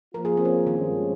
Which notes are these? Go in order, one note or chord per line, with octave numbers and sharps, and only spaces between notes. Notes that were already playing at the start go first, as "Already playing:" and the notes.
F3 A#3 F4 A#4
G#4
C4
C#4
D#3
G2 F3 G#3 C#4